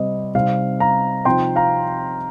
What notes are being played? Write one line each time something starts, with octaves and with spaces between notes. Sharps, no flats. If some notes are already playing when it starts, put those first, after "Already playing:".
Already playing: C3 G3 C4 D#5
C3 G3 C4 D#4 F5
F5 A#5
C3 F3 C4 D#4 G5 C6
F5 A#5